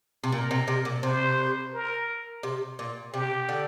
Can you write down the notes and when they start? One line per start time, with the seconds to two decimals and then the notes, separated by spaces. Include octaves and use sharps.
0.24 C3
0.32 A#2 A#4
0.51 C3
0.68 C3
0.85 A#2
1.03 C3 C5
1.74 A#4
2.43 C3
2.79 A#2
3.14 C3 G4
3.49 D3